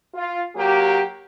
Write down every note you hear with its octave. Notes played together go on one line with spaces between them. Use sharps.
F4
F#3 A#3 G4